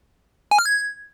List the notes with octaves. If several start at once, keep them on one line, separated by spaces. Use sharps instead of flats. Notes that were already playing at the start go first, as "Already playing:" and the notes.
G#5
F6
G#6